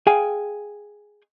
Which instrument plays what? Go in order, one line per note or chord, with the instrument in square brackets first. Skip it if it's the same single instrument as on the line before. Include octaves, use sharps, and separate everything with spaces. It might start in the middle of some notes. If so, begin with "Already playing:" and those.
[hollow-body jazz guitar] G#4 F5 G5 G#5